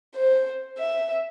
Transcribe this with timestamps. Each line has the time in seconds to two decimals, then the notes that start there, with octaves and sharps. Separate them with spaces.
0.15 C5
0.78 E5